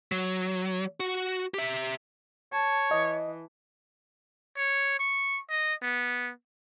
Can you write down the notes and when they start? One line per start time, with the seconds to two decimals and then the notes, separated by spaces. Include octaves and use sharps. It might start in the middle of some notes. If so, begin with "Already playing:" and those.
0.12 F#3
1.00 F#4
1.54 G4 E5
2.52 C#5 A5
2.91 E3 D#5
4.57 C#5
4.99 C#6
5.50 D#5
5.82 B3